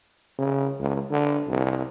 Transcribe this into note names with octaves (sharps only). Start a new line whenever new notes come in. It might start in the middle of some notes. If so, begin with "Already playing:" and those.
C#3
C#2
D3
C2